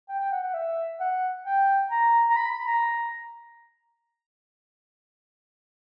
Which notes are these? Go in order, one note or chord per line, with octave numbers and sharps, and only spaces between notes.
G5
G5
F#5
F#5
E5
F#5
G5
A#5
A#5
B5
B5
A#5